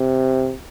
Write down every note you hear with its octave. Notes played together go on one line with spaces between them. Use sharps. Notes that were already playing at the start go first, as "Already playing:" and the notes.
Already playing: C3